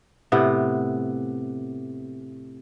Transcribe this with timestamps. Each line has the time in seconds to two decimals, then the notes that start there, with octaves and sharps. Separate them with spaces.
0.32 A2 C3 B3